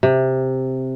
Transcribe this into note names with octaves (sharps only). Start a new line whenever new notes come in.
C3